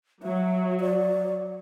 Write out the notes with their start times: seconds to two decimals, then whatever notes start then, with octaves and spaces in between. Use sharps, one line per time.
0.23 F#3 E5
0.80 D5